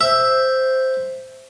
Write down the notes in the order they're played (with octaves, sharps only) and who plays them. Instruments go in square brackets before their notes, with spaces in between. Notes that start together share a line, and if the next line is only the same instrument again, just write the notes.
[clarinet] C5 [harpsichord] E5